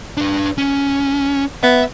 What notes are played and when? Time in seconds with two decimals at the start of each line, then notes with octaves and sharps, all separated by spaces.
0.17 D4 B4
0.58 C#4
1.63 B3 E5